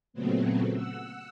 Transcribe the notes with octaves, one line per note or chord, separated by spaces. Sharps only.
A#2 C#3 F#3 A3 B3 C4
F#5 E6